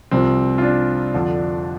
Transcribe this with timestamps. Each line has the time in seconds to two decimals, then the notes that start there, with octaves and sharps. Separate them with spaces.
0.11 C2 C3 F3 C4
0.58 F4
0.62 D4
1.14 F2 D3 F3